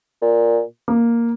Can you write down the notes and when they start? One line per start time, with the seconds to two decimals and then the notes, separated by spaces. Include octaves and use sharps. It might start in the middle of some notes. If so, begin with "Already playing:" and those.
0.22 A#2
0.88 A#3